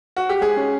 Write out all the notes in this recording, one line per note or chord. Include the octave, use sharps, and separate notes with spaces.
F#4
G4
G#3 G#4
C#4